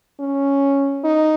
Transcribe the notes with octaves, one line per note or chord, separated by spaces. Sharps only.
C#4
D#4